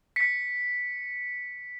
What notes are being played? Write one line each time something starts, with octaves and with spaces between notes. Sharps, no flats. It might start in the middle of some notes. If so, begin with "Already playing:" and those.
B6 C#7